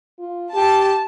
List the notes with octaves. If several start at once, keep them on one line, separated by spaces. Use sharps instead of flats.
F4
G4 A5